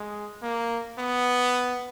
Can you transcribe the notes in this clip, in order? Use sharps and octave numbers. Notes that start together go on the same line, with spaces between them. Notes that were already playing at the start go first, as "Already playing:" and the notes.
Already playing: G#3
A#3
B3